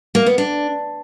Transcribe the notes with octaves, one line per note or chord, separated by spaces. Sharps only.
A#3
B3
D4